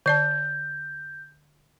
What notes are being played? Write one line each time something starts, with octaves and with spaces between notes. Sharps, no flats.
D3 D5 A5 G6